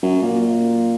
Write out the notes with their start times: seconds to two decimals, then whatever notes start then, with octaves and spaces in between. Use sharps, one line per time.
0.03 F#2
0.23 A#2